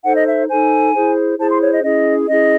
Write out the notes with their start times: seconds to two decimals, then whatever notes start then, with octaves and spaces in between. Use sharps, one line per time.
0.04 D#4 A4 C5 F#5
0.15 D#5
0.26 E5
0.49 D#4 A4 C5 G#5
0.93 E4 G#4 C5
1.39 E4 G#4 C5 A5
1.49 C6
1.61 C#5
1.72 D#5
1.83 C#4 E4 G#4 D#5
2.28 C#4 E4 G#4 D#5